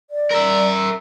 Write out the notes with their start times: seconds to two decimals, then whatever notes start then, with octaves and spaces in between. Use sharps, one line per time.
0.10 D5
0.30 A#4 E5